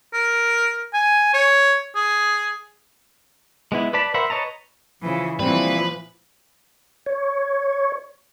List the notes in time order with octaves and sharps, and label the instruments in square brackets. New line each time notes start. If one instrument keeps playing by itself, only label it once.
[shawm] A#4
G#5
C#5
G#4
[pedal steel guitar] G#3 B3 E4
B4 D5 A5 B5
A#4 C5 E5 F#5 B5
B4 C#5 D#5 A5 A#5
[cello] C#3 E3 [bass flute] F3
[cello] A#2 E3 [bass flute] F3 [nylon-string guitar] G3 C4 [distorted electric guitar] B4
[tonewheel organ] C#5